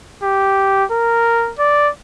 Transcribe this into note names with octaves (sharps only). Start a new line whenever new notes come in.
G4
A#4
D5